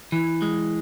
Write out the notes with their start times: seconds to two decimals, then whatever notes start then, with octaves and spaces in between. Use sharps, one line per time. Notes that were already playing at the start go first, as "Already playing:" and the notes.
0.12 E3
0.42 G#3